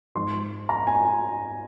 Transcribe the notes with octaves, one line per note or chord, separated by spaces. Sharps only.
G#2 F3 C6
A#5
G#5